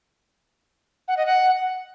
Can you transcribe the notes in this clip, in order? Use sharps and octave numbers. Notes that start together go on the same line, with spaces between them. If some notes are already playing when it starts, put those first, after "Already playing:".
F#5
D#5
F#5